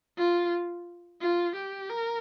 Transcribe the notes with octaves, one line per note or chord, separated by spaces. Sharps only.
F4
F4
G4
A#4